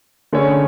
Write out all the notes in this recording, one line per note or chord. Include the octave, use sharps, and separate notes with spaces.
D3 A3 C#4 G#4 C#5